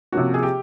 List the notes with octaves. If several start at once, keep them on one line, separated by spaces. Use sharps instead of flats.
C3 F3 A#3 C#4 F#4
G#4
G4